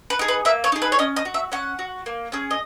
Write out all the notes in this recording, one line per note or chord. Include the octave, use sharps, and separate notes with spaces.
B4
D#4 G#4
B4
A#3 E5
C#5
D#4 G#4
B4
C#5
C#4 D#5
D#5
F#4
E5
C#4 F#5
F#4
A#3
C#4 G#4
D#5